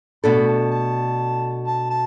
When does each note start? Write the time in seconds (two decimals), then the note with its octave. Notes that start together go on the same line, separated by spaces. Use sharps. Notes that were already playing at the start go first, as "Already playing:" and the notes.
0.24 B2 A3 D4 A4 B5
0.48 A5
0.71 A5
1.67 A5
1.90 A5